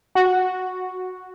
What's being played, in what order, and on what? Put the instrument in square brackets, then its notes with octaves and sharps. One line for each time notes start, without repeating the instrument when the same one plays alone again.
[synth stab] F#4